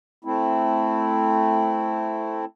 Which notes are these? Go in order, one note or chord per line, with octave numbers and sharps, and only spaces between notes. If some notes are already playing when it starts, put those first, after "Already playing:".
A3 C4 E4